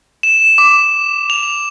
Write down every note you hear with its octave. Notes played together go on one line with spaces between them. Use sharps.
E7
D6
F7